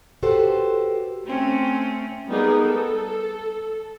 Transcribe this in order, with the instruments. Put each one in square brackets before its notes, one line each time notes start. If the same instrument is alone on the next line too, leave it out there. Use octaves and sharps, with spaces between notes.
[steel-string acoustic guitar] F#4 G4 A4 B4 C5
[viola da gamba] A3 C4 C#4
[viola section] G3 B3 D#4 G#4 A#4
A4